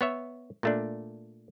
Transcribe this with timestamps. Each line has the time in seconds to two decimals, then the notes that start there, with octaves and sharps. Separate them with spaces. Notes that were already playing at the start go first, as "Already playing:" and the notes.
0.01 B3 C#5 E5
0.63 A#2 A3 D4